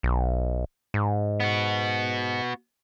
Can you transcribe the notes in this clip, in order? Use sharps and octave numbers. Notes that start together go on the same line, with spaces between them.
B1
G#2
B3 F#4